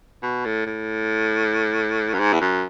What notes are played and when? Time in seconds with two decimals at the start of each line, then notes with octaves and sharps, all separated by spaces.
0.22 B2
0.45 A2
0.66 A2
2.14 F#2
2.19 G#2
2.33 E2
2.41 F#2